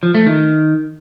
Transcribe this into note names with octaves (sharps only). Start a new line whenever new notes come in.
F3
A3
D#3